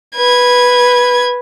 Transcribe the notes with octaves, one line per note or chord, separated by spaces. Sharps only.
B4 G#6